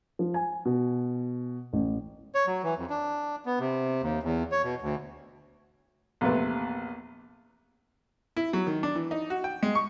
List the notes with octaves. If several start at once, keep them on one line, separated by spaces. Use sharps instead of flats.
F3
G#5
B2
A1
C#5
F#3
E3
F2
D4
B3
C3
D#2
E2
C#5
B2
D2
A#1 E2 C3 A3 B4
E4
F#3
D#3
D4
E3
D#4
F#4
G5
G#3
C#6